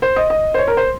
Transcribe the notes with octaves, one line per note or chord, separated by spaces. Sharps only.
C5
D#5
D#5
C5
C#5
A#4
C5